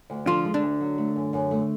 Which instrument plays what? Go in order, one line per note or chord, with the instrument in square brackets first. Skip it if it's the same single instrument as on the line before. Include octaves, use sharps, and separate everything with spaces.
[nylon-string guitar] D2
[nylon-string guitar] D3 [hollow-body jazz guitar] F3 F4
[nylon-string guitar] G#3
[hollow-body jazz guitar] D3 D4
[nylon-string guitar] D2
F#3
A3
F#2
F#2
A3